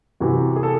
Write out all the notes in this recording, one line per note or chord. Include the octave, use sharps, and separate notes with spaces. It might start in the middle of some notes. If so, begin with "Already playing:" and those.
C3 E3 F#4
G#4
A4